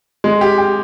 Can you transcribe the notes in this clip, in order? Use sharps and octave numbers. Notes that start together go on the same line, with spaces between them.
G#3
G4
G4